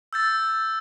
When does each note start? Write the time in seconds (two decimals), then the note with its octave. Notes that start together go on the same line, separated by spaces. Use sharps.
0.13 E6 G6 A6